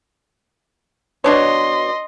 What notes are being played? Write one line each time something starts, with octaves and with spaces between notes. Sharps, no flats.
B2 D4 C#5 D#5 C6